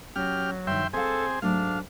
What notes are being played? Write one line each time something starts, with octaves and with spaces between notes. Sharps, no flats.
F#3 C#4 G4 F6
G2 D#3 E5 G5 C6
C4 G#4 A4 E5 F5
G#2 F#3 A3 D4 F5